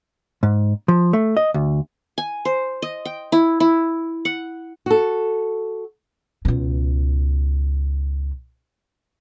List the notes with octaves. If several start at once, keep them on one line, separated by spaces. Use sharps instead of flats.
G#2
F3
A3
D#5
D2
G#5
C5
D#5
G5
E4
E4
F#5
F#4 A4
C#2 B2